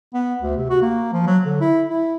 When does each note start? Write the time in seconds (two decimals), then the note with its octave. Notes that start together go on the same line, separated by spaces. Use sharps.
0.14 B3
0.42 D2
0.57 C3
0.70 F#4
0.82 A#3
1.13 F3
1.27 F#3
1.46 D3
1.61 E4
1.90 E4